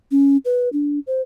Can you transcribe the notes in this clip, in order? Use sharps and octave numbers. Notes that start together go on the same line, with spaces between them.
C#4
B4
D4
C5